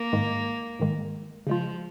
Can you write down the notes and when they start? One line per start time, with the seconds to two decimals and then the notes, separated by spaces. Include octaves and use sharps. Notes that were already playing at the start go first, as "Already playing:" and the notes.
Already playing: A#3
0.13 G#2 D#3 G#3
0.79 G#2 D#3 G#3
1.47 C#3 F3 G#3 F4